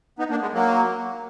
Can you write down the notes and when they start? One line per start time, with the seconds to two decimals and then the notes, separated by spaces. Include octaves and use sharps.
0.19 B3 D#4
0.30 A#3 D4
0.42 G#3 B3
0.54 F#3 A#3